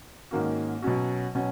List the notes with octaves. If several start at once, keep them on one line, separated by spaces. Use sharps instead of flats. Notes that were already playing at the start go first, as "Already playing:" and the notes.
G#2 D#3 A#3 C#4 F#4
B2 F#3 C#4 F#4
B2 F#3 C#4